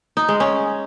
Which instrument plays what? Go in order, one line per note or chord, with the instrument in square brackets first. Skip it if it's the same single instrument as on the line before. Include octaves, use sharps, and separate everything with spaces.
[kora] D#4
G#3
C#4